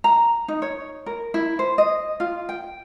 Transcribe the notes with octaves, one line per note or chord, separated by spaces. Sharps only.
A#5
D#4
C#5
A#4
E4
C5
D#5
F4
G5